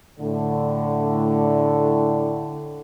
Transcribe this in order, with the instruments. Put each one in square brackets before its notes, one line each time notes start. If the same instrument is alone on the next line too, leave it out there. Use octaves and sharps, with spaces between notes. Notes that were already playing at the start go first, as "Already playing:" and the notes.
[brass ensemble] A2 D3